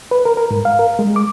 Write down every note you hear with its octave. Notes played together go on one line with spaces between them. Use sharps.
B4
A#4
A#4
G#2
F5
A#4
G#3
D6